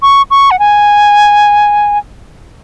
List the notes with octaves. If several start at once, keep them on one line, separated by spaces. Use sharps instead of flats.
C#6
C#6
F#5
G#5